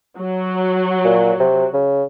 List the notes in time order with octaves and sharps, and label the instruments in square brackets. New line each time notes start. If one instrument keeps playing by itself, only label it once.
[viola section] F#3 F#4
[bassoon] A#2
C3
C#3